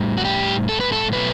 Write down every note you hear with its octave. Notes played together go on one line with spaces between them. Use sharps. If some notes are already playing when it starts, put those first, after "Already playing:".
Already playing: A2 G3
F#4
G4
A4
B4
A4
B2 F#3 A3 B4